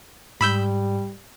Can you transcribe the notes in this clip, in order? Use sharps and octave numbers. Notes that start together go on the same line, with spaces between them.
G#2 G3 B5 E6 G6